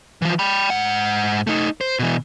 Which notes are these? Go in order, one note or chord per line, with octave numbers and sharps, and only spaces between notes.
E3 F3
G5 B5
G#2 F#5
A3 D#4
C5
B2 E3